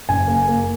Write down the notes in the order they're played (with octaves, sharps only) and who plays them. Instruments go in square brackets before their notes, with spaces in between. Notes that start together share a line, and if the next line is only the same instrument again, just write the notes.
[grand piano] F#1 G#5
A#3
A#3